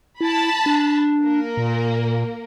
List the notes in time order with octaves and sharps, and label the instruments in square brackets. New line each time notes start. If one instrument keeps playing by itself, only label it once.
[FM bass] E4 [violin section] A5 B5
[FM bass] D4
[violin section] A#3 A#4
[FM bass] A#2